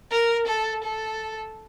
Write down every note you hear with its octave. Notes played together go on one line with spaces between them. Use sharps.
A#4
A4
A4